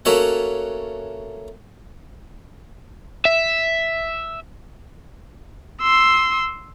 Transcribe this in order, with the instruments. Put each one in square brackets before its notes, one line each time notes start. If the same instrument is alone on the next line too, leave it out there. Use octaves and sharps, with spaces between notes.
[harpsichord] A3 A#3 C#4 F#4 E5 F#5
[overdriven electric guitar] E5
[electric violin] C6 E6